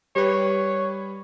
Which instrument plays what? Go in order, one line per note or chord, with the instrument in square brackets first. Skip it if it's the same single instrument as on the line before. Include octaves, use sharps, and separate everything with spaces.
[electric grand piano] G3 B4 [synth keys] G4 [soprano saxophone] C#5